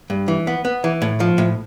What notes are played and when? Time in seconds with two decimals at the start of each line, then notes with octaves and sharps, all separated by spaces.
0.10 G2
0.28 E3
0.47 B3
0.65 B3
0.84 E3
1.02 A2
1.20 F3
1.38 A2